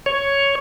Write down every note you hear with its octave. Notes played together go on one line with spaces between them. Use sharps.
C#5